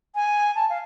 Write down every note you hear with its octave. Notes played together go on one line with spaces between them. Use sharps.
G#5
A5
F5